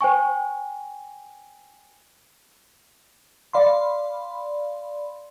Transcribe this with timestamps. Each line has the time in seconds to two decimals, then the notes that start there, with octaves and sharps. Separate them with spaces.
0.01 C5 G5 G#5 C#6
3.53 D5 F5 B5 C6